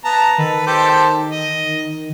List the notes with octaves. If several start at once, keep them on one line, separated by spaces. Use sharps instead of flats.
B3 A5 A#5
D#3 A4 B4
G4 A4 C5
D#5